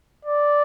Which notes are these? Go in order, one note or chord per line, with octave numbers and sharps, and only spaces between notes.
D5